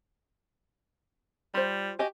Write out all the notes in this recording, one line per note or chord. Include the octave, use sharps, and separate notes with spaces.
G3 F4 C5
F#4 G4 D#5 G#5